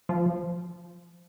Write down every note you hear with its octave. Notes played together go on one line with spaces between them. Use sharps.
F3